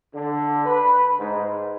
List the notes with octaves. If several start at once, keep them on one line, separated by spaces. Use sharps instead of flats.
D3
B4
G#2